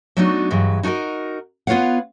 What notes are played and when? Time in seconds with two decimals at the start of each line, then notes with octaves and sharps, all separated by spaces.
0.17 F#3 A3 B3 D4 D#4 F#4
0.50 G2 E3 F#3 G#3
0.83 D#4 F#4 G#4 A#4 D#5
1.67 B3 F4 B4 C#5 F5 F#5